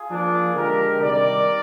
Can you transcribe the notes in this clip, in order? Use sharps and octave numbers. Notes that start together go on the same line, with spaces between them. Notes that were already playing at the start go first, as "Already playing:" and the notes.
Already playing: F4 G#4
F3 A#3 D4
D3 G#3 D4 G4 A#4
C3 D#3 G3 A#4 D5